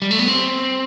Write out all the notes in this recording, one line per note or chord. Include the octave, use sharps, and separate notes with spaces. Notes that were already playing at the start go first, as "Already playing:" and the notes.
G3
A3
B3
C4